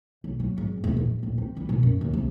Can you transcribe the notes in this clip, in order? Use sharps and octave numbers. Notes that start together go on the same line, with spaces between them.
B1
F#3
G#1
E1
A#1
D#1
C4
G3
B2
F#2
D#2
C2